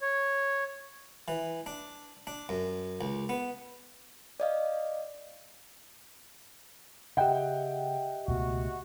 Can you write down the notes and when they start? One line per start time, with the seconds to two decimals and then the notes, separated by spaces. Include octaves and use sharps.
0.02 C#5
1.28 E3
1.66 D4
2.27 D4
2.49 F#2
3.01 C#2
3.29 B3
4.40 D5 D#5 F5
7.17 C#3 G4 D#5 E5 F#5 G5
8.28 C#2 B2 A3 F#4